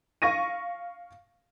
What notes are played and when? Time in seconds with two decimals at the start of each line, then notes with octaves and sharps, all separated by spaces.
0.22 F5 C#6 A#6 D#7